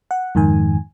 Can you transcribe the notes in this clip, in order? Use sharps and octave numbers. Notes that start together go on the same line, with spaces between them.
F#5
F2 G#2 D#3 G#5